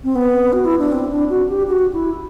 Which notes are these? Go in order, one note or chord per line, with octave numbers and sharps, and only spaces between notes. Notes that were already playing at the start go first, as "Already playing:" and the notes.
C4
B3
F#4
E4
D4
C4
D4
F#4
G4
F#4
E4